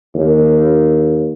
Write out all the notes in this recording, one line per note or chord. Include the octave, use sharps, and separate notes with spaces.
D#2